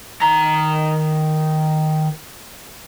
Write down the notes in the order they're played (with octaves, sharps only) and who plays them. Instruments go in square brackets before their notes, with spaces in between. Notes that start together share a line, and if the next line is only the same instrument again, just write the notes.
[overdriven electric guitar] D#3 A#5